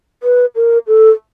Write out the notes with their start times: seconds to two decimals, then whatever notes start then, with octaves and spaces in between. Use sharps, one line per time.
0.23 B4
0.56 A#4
0.87 A4